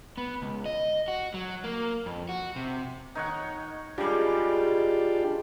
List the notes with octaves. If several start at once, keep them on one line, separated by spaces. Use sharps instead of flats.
B3
C#2
D#5
F#4
F#3
A#3
F2
F#4
C3
D#3 D#4 C#5 F#5
C#3 G3 G#3 D4 F4 G4